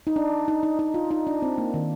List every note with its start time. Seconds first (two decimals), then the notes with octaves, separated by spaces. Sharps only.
0.07 D#4
0.16 D4
0.48 D#4
0.63 D#4
0.79 D#4
0.94 F4
1.11 D#4
1.27 D4
1.42 C4
1.58 A#3
1.74 D#3